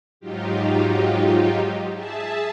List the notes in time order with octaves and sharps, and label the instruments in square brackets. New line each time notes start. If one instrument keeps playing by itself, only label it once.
[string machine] G#2 F#3 D#4 F4 G4
G#4 E5 A5